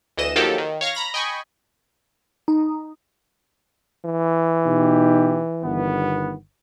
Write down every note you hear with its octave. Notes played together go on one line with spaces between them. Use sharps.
D2 E3 D#5 E7
D#3 F3 F#3 A#3 G4 A4
D#3
C#5 F5 C#6 A#6
A#5 B5 A#6
D#5 G5 G#5 B5 C#6
D#4
E3
B2 D#4 G4
G1 D#3 B3